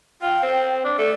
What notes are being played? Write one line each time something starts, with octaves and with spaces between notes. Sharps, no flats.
F4 G5
C4
D4
A3 D5